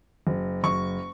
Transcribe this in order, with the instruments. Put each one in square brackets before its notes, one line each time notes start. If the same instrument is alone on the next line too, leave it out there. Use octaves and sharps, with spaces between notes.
[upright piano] F#1
F#1 C#6